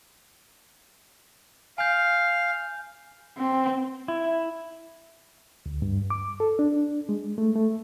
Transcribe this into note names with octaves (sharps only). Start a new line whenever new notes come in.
F5 G#5 G6
C4
E4
D2
G2
D6
A4
D4
G#3
A3
A3